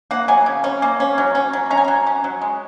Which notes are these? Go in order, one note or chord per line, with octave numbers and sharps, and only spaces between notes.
A#3 F#5
F#3 G#5
C#3
C#4
A#3
C#4
F#3
C#4
F#3
C#4 A#5
G#5
F#3 A#5
C#4
F#3
G#3